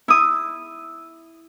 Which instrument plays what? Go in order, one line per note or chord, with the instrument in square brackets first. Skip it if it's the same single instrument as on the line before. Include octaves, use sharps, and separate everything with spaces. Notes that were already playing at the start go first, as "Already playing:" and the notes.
[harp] E4 D#6